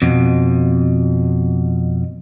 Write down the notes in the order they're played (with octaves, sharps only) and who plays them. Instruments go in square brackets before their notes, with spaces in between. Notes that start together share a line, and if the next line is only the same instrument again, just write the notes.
[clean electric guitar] F2 B2